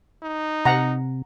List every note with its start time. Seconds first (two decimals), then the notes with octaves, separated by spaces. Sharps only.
0.23 D#4
0.65 C3 F#5 A#5